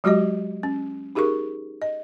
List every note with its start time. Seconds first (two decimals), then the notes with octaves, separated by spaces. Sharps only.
0.04 F#3 G#3 F#4 G4 D#5
0.63 C#4
1.15 D#4 G4 G#4 A#4 C#6
1.82 D#5